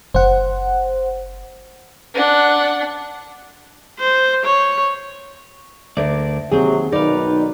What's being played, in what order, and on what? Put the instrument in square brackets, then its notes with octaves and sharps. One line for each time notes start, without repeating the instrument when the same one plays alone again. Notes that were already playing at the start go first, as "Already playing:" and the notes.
[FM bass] F#1 [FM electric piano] C5 F#5
[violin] D4 F#5
[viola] C5
C#5
[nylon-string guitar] D2 [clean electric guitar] D4 A#4 D5
[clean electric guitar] D#2 C4 [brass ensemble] C3 F#3 [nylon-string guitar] G#4
[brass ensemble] B1 D#3 B4 [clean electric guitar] D#4 F5 [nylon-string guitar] D5